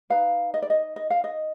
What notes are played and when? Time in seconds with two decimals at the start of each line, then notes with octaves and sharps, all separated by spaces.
0.10 D#4 B4 F5
0.54 D#5
0.62 D5
0.70 D#5
0.96 D#5
1.10 F5
1.24 D#5